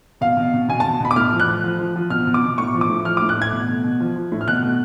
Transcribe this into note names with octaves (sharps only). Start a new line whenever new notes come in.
B2 F5
B2
B2
B2 G#5
A5
B2
B2 B5
D6
A2 F6
F3
F#6
F3
F3
F3
F3
B2 F6
B2
D6
B2
A2 C#6
F3
D6
A2
F3 F6
D6
A2
F#6
A2 G#6
B2
B2
B2
F3
F3
A2
F6
B2 F#6
B2